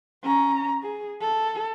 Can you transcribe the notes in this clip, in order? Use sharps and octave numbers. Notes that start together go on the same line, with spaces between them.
C#4 A#5
G#4
A4